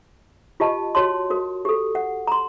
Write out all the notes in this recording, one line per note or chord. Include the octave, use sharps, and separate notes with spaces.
F4 G4 D#5 A5
F#4 C#5 A5 C6
F#4 A#4
G4 A4
F#5
A#5 C6